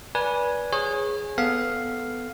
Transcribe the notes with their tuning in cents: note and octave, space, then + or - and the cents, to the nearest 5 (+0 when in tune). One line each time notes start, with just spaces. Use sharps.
B4 -20 D5 -15 G#5 +0
G#4 +0 C#5 -30
B3 +10 A4 +0 F5 +0